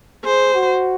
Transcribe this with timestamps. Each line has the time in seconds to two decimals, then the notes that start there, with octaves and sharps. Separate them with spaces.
0.25 G#4 C5
0.54 F#4